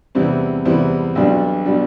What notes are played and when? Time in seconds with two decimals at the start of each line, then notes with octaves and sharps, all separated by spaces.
0.15 E2 C3 G3 C4 E4
0.65 E2 C3 G3 C4 E4
1.15 B1 B2 G3 D4
1.66 B2 G3 D4